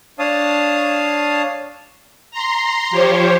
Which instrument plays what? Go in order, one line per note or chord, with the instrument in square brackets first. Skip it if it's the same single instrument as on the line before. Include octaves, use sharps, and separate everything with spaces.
[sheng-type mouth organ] D4 C#5 F5 A5 D#6
[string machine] A#5 C6
F3 G4 C5 C#5